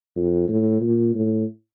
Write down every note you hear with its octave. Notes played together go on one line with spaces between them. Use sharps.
F2
A2
A#2
A2